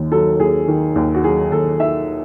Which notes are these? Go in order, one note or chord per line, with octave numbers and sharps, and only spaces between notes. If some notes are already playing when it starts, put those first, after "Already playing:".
Already playing: D#2 D#3
F#3 A4
D#2 G#4
D#3
D#2
F#4
F#3 G#4
D#2 A4
D#3 E5